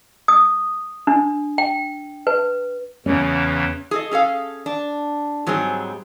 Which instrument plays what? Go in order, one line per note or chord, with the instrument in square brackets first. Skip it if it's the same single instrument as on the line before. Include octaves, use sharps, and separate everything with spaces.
[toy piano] D#6
D4
G5
B4
[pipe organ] E2 C#3 E3 [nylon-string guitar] C#4
[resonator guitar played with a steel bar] G#4 A4 D#5
C#4 G#4 A4 F5
D4
G#2 F#3 G3 C4 G#4